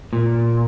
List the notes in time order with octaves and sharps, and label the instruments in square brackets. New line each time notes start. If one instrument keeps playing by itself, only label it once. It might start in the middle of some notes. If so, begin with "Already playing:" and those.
[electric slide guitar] A#2